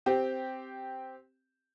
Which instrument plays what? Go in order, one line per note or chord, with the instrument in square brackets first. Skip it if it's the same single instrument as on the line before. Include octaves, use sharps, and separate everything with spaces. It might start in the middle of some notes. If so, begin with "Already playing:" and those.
[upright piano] C4 G4